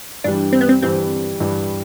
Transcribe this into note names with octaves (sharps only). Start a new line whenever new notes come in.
G2 E3 G3 D4
C4
B3
C4
G2 E3 G3 C4
G2 E3 G3